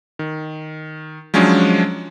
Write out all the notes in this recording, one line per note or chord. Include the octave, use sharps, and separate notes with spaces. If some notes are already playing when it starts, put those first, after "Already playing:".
D#3
F3 F#3 G#3 C#4 D4